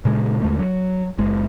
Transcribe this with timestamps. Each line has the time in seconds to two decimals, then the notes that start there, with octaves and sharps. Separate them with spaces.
0.05 A#2 C#3 G#3
0.42 D#2 D3 G#3 A3
0.59 F#3
1.18 F#1 G#3